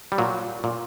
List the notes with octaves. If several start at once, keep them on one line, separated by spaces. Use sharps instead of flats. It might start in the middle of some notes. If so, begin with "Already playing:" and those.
G3
A#2 F#3
A#2